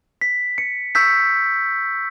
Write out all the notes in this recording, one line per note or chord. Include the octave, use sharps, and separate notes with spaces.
B6
C#7
C#6 E6 G6 B6